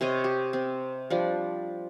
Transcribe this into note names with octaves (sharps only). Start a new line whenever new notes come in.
C3 C5 C#5 D#5
G4
C4
F3 G3 D4